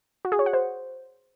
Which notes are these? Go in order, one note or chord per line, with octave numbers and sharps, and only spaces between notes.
F#4
G#4
C#5
F#5
C5